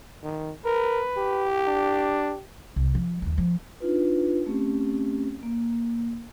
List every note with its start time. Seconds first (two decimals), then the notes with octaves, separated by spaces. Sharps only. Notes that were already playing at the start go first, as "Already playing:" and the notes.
0.23 D#3
0.65 A#4 B4
1.17 G4
1.67 D4
2.76 C2
2.95 F3
3.22 D#2 E3
3.38 F3 A#3
3.80 D4 D#4 F4 B4
4.46 A3 C4 C#4 G4
5.43 A#3